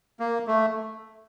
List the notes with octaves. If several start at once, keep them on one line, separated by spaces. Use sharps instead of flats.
A#3
A3